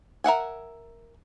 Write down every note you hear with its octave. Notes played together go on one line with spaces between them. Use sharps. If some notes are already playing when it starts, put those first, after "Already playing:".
A#4 E5 F#5 G#5